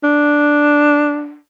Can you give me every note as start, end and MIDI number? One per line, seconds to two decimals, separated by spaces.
0.03 1.37 62